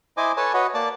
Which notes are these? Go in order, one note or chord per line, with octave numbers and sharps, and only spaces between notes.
E4 C5 D#5 G#5 D6
A4 B4 C#5 G#5 A5
F#4 B4 C#5 D#5
A#3 D5 A5 D6